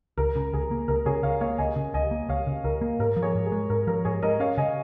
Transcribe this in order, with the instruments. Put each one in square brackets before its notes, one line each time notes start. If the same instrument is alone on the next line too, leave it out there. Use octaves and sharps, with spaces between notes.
[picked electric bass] C#2 [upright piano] A#4
[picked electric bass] C#3
[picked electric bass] C#2 [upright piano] G#4
[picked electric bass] A#3
[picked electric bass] C#2 [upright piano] A#4
[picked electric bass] C#3 [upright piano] G#4 C#5
[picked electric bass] C#2 [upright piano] C#5 F5
[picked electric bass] A#3 [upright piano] C#5 F5
[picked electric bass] C#2 [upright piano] D#5 G#5
[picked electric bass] C#3
[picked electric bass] C#2 [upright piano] D#5 G#5
[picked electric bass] A#3
[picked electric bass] C#2 [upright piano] C#5 F5
[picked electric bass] C#3
[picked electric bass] C#2 [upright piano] A#4
[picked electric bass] A#3
[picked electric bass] G#2 [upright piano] A#4
[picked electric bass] F3
[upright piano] G#4 C#5
[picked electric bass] G#2
[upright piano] G#4
[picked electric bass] G#3
[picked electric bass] G#2 [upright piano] A#4
[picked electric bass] F3 [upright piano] A#4
[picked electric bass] G#2 [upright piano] G#4 C#5
[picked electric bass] G#3 [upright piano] A#4 D#5
[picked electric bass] C#4 [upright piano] C#5 F5
[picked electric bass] C#3 [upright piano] D#5 G#5